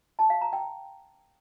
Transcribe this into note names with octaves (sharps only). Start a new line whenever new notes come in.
A5
F5
A#5
G5